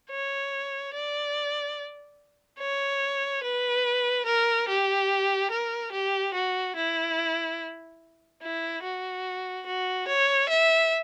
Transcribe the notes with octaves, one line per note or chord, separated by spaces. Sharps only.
C#5
D5
C#5
B4
A#4
G4
A#4
G4
F#4
E4
E4
F#4
F#4
C#5
E5